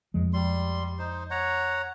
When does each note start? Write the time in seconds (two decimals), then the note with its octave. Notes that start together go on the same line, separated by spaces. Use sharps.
0.14 F2 F3 G#3
0.34 G3 C6
0.99 D#4 C5
1.30 C#5 F#5 A#5